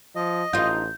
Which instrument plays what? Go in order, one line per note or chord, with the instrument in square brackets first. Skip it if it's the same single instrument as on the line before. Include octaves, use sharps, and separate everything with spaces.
[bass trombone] F3 [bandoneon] D#5
[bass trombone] A1 [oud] D#4 F4 [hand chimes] G6